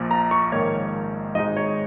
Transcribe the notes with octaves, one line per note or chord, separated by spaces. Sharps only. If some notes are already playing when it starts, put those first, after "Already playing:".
Already playing: A#1 A#2 F3
A#5
C#6
A#1 G#2 D#3 A#3 C#5
G#1 G#2 G#3 D#4 D#5
C#5